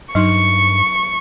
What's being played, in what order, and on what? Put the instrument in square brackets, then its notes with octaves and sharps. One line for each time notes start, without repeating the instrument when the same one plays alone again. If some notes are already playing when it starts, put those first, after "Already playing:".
[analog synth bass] G2 [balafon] F#3 D#4 [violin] C#6